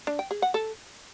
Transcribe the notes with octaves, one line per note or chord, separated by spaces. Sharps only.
D4
G5
G#4
F#5
A4